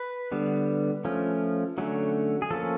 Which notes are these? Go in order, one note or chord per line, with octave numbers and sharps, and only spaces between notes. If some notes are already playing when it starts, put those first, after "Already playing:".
Already playing: B4
D3 G3 B3
F3 A3 C#4
D3 F#3 A3 C#4
G#4
F3 A#3 C#4 A4